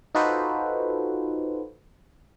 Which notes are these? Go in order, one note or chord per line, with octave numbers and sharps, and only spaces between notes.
D#4 F4 F#4 A4 B4 C5